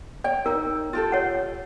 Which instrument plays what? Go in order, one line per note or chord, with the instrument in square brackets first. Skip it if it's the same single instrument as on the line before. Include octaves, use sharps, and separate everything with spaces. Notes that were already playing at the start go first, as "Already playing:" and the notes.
[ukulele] C#5 G5 [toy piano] D5
[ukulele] D#4 [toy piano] A#4
[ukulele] F4 G4 A4
[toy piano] C#5 F#5